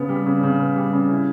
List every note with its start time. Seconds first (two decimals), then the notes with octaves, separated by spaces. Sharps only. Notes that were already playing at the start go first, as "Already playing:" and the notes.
Already playing: C#3 B3
0.09 G3
0.26 C#3
0.43 C#3
0.60 B3
0.76 G3
0.93 C#3
1.10 E4